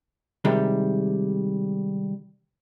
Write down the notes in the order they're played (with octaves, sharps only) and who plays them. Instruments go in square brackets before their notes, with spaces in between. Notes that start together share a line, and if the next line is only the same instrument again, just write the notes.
[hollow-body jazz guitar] C3 D#3 G3 G#3